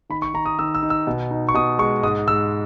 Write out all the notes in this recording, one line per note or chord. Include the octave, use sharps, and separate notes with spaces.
D#3 B5
C#6
D#3 A#5
D#6
D#3 E6
E6
D#4
E6
B2
D#4
C#6
B2 D#6
G#3 C#6
G#2 D#6
G#2 E6